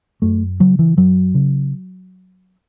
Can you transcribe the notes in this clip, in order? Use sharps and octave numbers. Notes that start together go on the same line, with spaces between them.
F#2 A3
C#3 F#3
E3
F#2 F#3
C#3